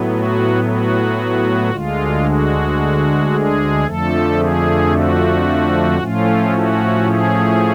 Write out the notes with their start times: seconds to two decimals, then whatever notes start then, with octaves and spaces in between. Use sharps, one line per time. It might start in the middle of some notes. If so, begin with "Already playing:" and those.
Already playing: A2 F#3 B3
0.10 F#4
0.64 F#4
1.70 D2 D3 G#3 F4
2.24 F#4
3.31 G#4
3.84 F2 D3 F3 A3 A4
4.38 G#4
4.91 F#4
5.98 A2 F3 A3 C#4 F4
6.52 F#4
7.05 G#4